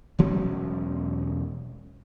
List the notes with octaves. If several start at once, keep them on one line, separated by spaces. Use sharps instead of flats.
E1 F#3 G#3 C#4